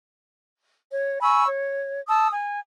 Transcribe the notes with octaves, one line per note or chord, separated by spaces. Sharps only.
C#5
G#5 B5 C#6 E6
C#5
A5 D#6 E6
G#5